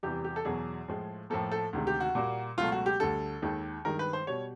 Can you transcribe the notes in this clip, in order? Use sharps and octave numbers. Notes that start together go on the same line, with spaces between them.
E2 C3 E3 G3 G4
G4
A4
E2 B2 F#3 G#4
A2 F3 G#3
A2 F3 A#3 A4
A4
D2 C3 D#3 G#3
G4
F#4
A#2 G3 A#3
C#2 B2 F#3 A3 F4
F#4
G4
D2 D3 G3 A4
D#2 D#3 G#3
G2 D#3 G#3 A#4
B4
C5
B2 G3 C#5